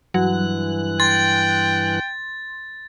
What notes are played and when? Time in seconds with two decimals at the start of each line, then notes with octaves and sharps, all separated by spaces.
0.14 G2 E3 F#3 F#6
1.00 G5 C6 A6